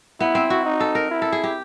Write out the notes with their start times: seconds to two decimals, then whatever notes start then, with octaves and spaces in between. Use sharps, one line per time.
0.20 B3 E4
0.35 C4
0.50 F#4
0.65 D#4
0.80 A4
0.95 A#4
1.11 E4
1.22 A4
1.32 G#4
1.44 G4